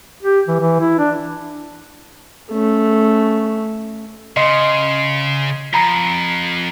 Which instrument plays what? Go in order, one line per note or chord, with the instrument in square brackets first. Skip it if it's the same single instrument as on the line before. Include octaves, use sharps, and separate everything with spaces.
[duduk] G4
E3
E3
E4
D4
[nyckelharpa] A3 C#4
[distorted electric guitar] C#3 [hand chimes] D#5 C6
[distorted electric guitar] F2 [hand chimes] A#5 B5